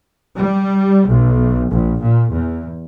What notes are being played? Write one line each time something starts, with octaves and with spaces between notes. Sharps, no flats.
G3
B1
A#1
A#2
E2